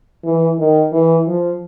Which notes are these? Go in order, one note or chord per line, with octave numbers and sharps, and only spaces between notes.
E3
D#3
E3
F3